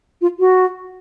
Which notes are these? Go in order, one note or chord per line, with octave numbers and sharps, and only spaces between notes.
F4
F#4